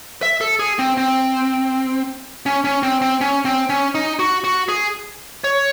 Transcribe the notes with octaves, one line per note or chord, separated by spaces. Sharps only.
E5
A4
G#4
C4
C4
C#4
C#4
C4
C4
C#4
C4
C#4
D#4
F#4
F#4
G#4
C#5